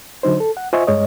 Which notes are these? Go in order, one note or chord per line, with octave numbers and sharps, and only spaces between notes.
D3 F#3 D#4 C5
A4
F#5
F4 C5 D#5 E5 G#5 C#6
G2 G#3 C#5 D#5